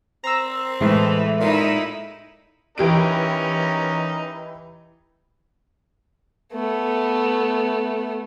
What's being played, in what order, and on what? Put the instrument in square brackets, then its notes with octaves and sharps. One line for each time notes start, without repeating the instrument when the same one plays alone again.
[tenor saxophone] C4 [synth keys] A#5 E6
[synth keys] A2 G#3 A3 [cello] E3
[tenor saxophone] A#2 [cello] D#4 E4
[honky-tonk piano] E3 G4 D7 [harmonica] C#4 D#4 A#4
[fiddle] A3 B3